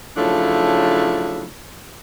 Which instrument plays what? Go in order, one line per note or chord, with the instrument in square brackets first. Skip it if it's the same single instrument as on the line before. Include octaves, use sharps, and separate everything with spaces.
[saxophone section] C#3 F3 F#3 A3 D4 E4